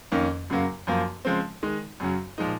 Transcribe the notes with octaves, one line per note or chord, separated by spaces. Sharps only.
F2 D#3 A#3 C#4
F#2 C#3 F#3 A#3
F#2 F3 A#3
C#3 F3 G#3 C4
D#3 G#3 D#4
F#2 C#3 F#3
A#2 F3 G#3 D#4